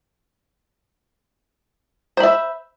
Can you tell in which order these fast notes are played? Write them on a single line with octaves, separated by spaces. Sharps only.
C5 B5 E5